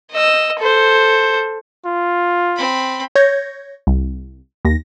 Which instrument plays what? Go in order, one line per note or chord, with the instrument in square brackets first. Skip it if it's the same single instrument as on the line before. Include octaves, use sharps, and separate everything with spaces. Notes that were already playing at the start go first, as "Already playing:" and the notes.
[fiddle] D#5 E6
A4 C5
[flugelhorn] F4
[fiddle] C4 B5
[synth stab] C#5 G6 G#6 A#6
C2
D#2 A#6